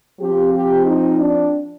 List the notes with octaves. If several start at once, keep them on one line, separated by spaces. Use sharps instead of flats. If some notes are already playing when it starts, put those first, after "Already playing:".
F3 C4 G4
G4
D#4
D4